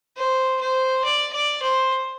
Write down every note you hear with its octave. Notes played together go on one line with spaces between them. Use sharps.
C5
C5
D5
D5
C5